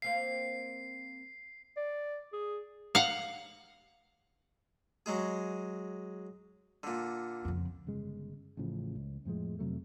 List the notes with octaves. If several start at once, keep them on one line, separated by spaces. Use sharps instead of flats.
A#3 C4 F5 C7
D5
G#4
F5 F#5
F#3 G#3 G#4
A#2 D3
F2 C#3
G1 C#3 G#3
A1 A2 C#3 F3
C#2
F2 A2 F3 G#3
F2 C3 F#3 A3